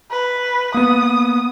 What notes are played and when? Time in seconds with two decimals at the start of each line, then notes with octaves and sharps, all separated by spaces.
0.11 B4
0.74 A#3 B3 D#6